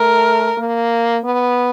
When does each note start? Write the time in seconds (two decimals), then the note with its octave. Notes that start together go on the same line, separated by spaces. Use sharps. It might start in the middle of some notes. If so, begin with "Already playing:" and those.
Already playing: A3 A#4
0.58 A#3
1.25 B3